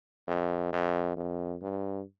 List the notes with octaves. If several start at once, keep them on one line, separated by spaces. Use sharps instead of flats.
F2
F2
F2
G2